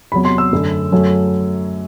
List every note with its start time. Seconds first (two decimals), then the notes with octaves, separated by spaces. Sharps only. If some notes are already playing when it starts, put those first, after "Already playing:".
0.12 E2 C3 F#3 B5
0.25 C6
0.38 E6
0.52 F#2 D3 A3
0.92 F#2 F#3 A3